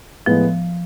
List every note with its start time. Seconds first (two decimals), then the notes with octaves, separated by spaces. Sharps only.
0.26 A2 F3 G#3 B3